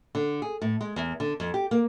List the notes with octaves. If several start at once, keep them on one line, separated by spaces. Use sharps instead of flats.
D3
G#4
A2
G#3
E2
D3
F2
G4
A#3